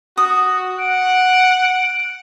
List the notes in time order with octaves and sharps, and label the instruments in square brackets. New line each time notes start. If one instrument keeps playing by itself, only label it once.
[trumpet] F#4 [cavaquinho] D#6
[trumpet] F#5 [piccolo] D7